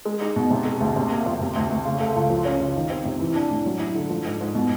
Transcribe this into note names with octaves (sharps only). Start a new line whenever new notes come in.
G#3
D#4
B2
C3
G#3
D2
C3
A#3
F2
C3
D2
D2
C#3
A3
C#2
F3
C#4
C#3
D#3
C4
C3
E3
D4
A2
F#3
E4
D3
F3
G#2
G#2
B2